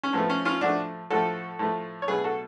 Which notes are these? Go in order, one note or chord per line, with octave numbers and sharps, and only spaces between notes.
C#4
A2 F3 A3 B3
C#4
C#4 F4
A2 F3 A3 D4 F#4
A2 F3 A3 F#4 A4
A2 F3 A3
C#5
B2 F#3 A3 G#4 B4
F#4 A4